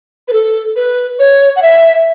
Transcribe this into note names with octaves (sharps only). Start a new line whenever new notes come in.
B4
A4
B4
C#5
F#5
E5